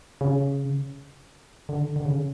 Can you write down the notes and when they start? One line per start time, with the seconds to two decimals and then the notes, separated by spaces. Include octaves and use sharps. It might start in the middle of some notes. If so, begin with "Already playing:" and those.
0.21 C#3
1.69 D3
1.96 D3
2.05 C#3